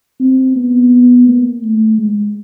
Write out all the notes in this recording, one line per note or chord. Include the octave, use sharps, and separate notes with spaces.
C4
B3
A#3
A3
G#3